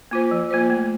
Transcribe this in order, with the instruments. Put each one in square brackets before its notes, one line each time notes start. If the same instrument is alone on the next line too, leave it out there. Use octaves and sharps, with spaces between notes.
[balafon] A#3 F4 C5
F3
A#3 F4 C5
A3